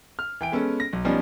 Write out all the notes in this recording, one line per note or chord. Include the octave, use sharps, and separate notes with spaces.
F6
E3 G5 D7
G#3 B3 C#4 A4
A#6
B1
F3 G3 B3 C#4 D#4